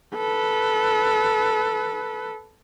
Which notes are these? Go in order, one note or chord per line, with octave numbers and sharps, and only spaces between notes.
A4 B4